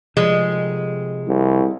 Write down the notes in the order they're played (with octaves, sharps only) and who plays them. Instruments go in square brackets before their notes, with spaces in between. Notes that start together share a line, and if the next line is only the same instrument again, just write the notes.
[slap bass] C3 F3 [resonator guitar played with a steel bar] G#3
[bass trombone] C2